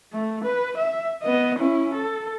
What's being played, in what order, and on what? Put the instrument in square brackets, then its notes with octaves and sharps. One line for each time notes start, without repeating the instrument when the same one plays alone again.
[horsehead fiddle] A3
B4
E5
B3 D#5
C#4 E4
A4